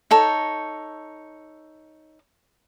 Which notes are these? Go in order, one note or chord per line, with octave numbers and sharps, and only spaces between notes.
D#4 A4 C#5